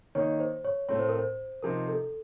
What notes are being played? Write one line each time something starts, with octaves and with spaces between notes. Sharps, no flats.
D#3 A#3 D#4 C#5
C5
C#5
A2 A3 C4 C#5
C5
A#4
C5
C3 F3 C4 D#4 A#4
A4